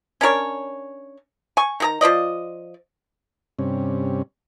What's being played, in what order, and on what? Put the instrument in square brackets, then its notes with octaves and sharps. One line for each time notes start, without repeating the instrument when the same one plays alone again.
[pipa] C#4 D4 A#4 C#5
G#5 C#6
D#3 G#4 A#5
F3 F4 D5 D#5
[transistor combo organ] G2 C3 C#4